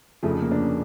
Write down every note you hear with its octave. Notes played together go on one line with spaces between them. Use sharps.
F1 F2 C#3 F3 A3
A#3
D4
C#4